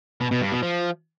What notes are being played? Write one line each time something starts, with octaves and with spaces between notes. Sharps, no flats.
B2
B2
G2
B2
F3